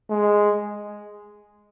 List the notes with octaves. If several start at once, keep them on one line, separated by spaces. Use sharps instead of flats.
G#3